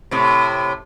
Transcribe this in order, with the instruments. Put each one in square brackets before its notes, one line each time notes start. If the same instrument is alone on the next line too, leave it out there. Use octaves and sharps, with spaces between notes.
[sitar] A2 C3